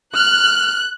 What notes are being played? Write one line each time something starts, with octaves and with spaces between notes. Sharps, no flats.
F6 F#6